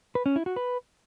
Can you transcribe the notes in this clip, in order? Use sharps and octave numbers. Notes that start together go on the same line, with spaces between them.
B4
C#4
E4
F#4
B4